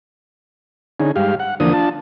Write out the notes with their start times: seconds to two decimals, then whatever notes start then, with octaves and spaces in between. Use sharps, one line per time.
1.00 D3 C#4 D#4 G#4
1.16 G2 G#3 G4 F5
1.39 F#5
1.60 E2 D3 F3 A#3 D4 D#6
1.73 D4 F4 A5